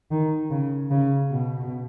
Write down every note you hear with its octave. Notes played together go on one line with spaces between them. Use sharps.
D#3
C#3
C#3
B2